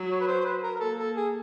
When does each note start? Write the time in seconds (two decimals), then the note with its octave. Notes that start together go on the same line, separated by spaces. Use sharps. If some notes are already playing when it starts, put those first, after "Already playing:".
Already playing: F#3
0.10 C#5
0.21 B4
0.27 C5
0.40 C5
0.45 B4
0.63 A#4
0.75 A#4
0.80 A#3 A4
0.98 A4
1.15 G#4